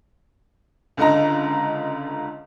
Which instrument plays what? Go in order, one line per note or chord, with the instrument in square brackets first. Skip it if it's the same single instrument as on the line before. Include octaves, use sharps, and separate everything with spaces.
[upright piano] C#2 D3 D#5 A#5